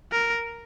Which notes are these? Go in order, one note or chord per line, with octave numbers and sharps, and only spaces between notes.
A#4